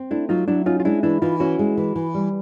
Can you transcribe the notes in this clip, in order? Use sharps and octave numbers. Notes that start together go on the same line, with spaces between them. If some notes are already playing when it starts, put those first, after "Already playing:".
Already playing: C4
A3 D4 E4
F#3 D#4 F4
F#3 D4 E4
C#4 D#4 F4
F4
G#3 D4 E4
E3 D4 E4
E3 D#4 F4
C#4 E4 F#4
G#3
E3
E3
G3